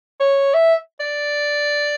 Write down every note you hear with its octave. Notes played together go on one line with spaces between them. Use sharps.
C#5
E5
D5